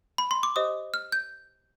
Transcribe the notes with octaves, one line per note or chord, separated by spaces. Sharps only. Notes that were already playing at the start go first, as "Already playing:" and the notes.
B5
C6
D6
G4 C5 D#5 D#6
F6
G6